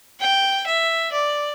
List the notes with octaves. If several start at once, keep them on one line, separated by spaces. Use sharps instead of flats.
G5
E5
D5